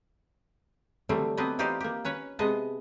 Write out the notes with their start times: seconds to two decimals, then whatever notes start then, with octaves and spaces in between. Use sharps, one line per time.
1.09 D3 E3 F#3 G3 A3 C4
1.37 F#3 B3 C4 D4 B4 D#5
1.59 E3 D#4 F4 G4 C5 D5
1.80 A#3 G4
2.05 C#4 B4 C#5
2.39 C3 G#3 B3 D#5 A5